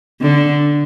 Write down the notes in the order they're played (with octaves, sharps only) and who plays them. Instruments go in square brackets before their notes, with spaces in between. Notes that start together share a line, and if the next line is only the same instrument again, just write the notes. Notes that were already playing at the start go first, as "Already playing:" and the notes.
[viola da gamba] D3